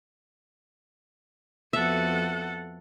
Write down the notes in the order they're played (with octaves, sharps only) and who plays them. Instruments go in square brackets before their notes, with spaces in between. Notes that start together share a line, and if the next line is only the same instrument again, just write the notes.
[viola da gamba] F2 B3 F#4 [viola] A4 F#5 [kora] E5